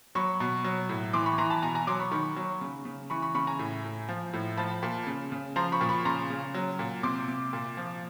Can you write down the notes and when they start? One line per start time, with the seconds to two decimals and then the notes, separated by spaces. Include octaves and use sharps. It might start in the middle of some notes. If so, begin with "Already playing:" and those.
0.15 F#3 B5 C#6
0.40 B2
0.64 F#3
0.89 A2
1.13 E3 C6 D6
1.26 B5 C#6
1.38 E3 A#5 C6
1.50 A5 B5
1.62 B2 G#5 A#5
1.75 G#5 A#5
1.87 F#3 C6 D6
1.99 B5 C#6
2.12 D#3 B5 C#6
2.36 F#3
2.61 C#3
2.85 C#3
3.10 E3 B5 C#6
3.22 B5 C#6
3.35 C#3 B5 C#6
3.47 G#5 A#5
3.59 A2
3.84 A2
4.09 F3
4.33 A2
4.57 F3 A5 B5
4.83 A#2
5.07 C#3
5.32 C#3
5.56 F3 A#5 C6
5.72 B5 C#6
5.81 A#2
5.89 B5 C#6
6.05 C#3 A#5 C6
6.30 C#3
6.54 F#3
6.79 A#2
7.03 C3 C6 D6
7.28 C3
7.53 A#2
7.77 F3